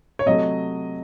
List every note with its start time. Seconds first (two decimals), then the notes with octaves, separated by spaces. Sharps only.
0.19 C#5
0.26 C3 F#3 A3 D#5